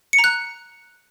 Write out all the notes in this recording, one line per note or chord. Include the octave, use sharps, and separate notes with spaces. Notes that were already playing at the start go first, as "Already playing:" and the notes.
C#7
A#5
F#6